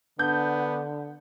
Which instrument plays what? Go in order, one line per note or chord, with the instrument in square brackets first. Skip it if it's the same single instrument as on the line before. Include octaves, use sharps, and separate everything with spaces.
[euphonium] D3 [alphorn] B3 [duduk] D4 [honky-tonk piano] G6